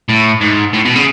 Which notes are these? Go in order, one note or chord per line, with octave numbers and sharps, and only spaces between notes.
A2
G#2
A2
B2
C#3